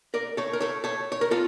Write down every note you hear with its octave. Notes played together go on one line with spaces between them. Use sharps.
A#4 D5
A4 C#5
A#4
A4 C#5
A4 C#5
C#5
A#4
F4 A4